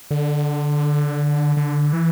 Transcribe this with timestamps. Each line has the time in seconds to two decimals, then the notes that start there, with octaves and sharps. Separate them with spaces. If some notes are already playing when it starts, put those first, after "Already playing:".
0.11 D3
1.57 D3
1.93 E3